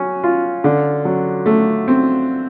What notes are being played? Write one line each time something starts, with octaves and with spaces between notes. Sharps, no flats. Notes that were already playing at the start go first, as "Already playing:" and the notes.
Already playing: F#3 C#4
F4
D3
F#3
A3
C4